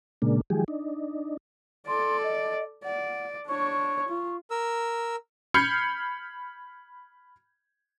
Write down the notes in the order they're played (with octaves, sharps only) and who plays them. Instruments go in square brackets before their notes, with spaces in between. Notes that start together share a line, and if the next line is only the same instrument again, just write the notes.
[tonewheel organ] A#2 C#3 G#3 A#3 D4
D#3 F3 F#3 G#3 G4 G#4
D4 D#4
[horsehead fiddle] A4 D5 [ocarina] C6
[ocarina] D#5
[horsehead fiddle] D5 [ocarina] F#5
[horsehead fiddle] D4 C#5 [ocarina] C#6
[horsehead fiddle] F4
[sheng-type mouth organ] A#4 E6
[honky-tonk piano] B5 F6 G6 G#6 C7 C#7